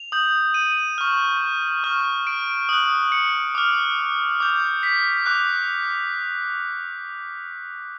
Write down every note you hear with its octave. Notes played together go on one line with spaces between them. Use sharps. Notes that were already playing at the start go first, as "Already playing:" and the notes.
Already playing: F7
D#6 G6
D#7
C#6 F6
C#6 F6
D7
D#6 F#6
C#7
D6 F6
D6 G6
B6
D6 F#6